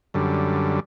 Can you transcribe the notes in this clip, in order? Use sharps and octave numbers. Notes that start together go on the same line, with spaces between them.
F#2 D3 G3